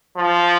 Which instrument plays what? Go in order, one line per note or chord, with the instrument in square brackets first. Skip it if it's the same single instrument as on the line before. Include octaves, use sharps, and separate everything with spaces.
[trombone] F3